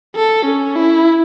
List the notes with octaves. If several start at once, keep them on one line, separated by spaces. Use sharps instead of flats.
A4
C#4
E4